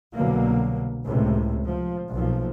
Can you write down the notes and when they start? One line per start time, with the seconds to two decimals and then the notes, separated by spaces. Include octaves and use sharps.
0.16 C2 B2 D3 F#3 A#3
1.07 C#2 A2 C3
1.66 F3
2.12 B1 A#2 F3